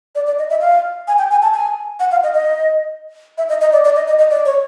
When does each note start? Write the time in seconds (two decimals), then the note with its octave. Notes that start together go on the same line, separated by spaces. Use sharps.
0.15 D5
0.26 D5
0.39 D#5
0.50 E5
0.61 F5
1.08 G#5
1.18 G5
1.31 G#5
1.42 A5
1.54 G#5
2.00 F#5
2.11 F5
2.23 D#5
2.34 D#5
3.38 E5
3.49 D#5
3.61 D#5
3.72 D5
3.85 D5
3.96 D#5
4.08 D#5
4.19 D#5
4.30 D5
4.46 C#5